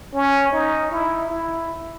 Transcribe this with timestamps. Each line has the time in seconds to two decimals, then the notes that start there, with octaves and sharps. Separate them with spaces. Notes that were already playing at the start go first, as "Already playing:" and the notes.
0.14 C#4
0.53 D#4
0.91 E4
1.30 E4